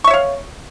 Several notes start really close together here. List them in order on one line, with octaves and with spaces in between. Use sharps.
C#6 E5 C#5 F5